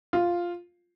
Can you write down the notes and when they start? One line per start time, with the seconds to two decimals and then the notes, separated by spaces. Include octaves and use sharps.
0.13 F4